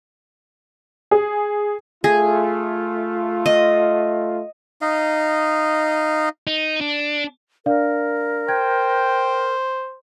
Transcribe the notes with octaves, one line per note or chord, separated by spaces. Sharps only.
G#4
A3 F4 G#4
D#5
D#4 D#5 F5
D#4
D4
D4 A#4 D5 F5
C5 G5 G#6